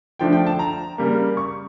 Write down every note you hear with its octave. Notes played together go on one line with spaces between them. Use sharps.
D3 F3 A3 D4 G5
G5
A5
A#5
C#3 G3 A#3
C#6